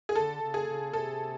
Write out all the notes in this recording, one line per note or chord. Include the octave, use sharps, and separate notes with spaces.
G#4
D3 A4
C#3
G#4
C#3
C3 A4